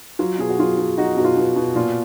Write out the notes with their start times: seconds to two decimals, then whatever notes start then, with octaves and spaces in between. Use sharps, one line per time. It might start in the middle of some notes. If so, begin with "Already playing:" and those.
0.19 F#3 F4
0.39 B2 G#4
0.49 F#4
0.59 F#3 F4
0.78 F#3
0.98 F#3 D#4 F#4
1.17 B2 F#4
1.24 F4
1.37 B2
1.56 B2
1.75 A#2 F4